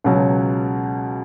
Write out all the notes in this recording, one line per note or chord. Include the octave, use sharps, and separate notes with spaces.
C#2 B2 F#3